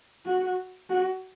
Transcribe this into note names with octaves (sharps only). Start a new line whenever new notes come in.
F#4
F#4